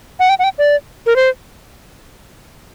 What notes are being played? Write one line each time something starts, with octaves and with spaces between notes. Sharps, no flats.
F#5
G5
F#5
G5
D5
A#4
C5